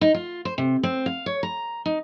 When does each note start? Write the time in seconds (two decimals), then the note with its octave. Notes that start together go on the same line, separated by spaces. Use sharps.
0.01 D#4
0.14 F4
0.45 C5
0.58 C3
0.83 C4
1.06 F5
1.26 C#5
1.43 A#5
1.86 D#4